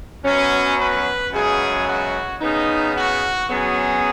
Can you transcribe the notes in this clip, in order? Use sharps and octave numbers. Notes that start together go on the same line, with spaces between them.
F#2 F#3 B3 C#4
B4
F#2 C#3 G#3 B3 G#4
F#4
C#3 B3 D#4
F#4
F#2 F#3 B3 G#4